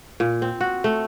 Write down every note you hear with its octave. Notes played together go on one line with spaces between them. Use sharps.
A#2
C4
F#4
A3